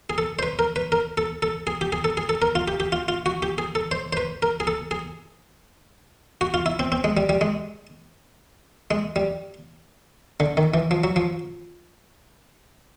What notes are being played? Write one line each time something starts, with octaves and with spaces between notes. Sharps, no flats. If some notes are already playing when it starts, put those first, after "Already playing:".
G#4
A4
C5
B4
A#4
B4
A#4
A4
A4
G#4
G4
G#4
A4
G#4
A4
A#4
F4
G4
G4
F4
F4
F#4
G4
G#4
A4
C5
C5
B4
A#4
G#4
A4
G#4
F#4
F4
E4
C4
C4
G#3
G3
G3
G#3
G#3
G3
D3
D#3
E3
F3
F#3
F3